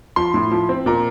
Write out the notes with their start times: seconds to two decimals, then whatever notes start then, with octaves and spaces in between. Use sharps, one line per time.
0.16 F3 C6
0.34 A2
0.51 F3
0.69 C4
0.86 A#2 A#5